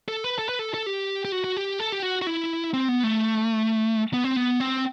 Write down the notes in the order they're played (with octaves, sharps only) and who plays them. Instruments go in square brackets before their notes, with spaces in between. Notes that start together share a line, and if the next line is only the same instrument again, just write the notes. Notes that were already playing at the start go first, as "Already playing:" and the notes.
[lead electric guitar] A4
B4
A4
B4
A4
A4
G4
G4
F#4
F#4
G4
A4
G4
F#4
F#4
E4
C4
B3
A3
B3
C4
B3
C4